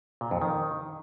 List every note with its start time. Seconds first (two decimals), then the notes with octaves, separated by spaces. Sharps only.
0.21 A#2
0.31 F2
0.42 D#3